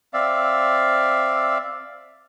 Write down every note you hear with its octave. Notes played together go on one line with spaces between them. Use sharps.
C4 D5 E5 F5